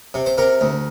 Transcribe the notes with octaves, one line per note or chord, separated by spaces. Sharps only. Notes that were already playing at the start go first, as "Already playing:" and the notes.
C3
C5
C3 A#4
D2